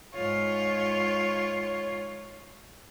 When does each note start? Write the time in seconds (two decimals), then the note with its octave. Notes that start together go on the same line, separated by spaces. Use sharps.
0.13 G#2 F4 C#5